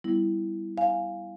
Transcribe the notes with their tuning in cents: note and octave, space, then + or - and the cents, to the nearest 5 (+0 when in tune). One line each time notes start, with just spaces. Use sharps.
G3 +0 B3 +0 E4 -5
F5 +0 G#5 +0